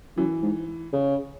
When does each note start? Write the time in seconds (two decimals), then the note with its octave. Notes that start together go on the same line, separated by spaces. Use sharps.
0.17 F#2 E3
0.42 G#2
0.93 C#3